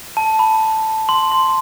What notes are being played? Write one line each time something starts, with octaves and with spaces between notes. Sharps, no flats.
A5
B5
C6
C6